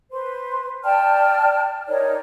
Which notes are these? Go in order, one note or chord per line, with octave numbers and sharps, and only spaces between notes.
B4 C5 C6
D5 G5 A5 F6
D#4 A#4 C#5 D5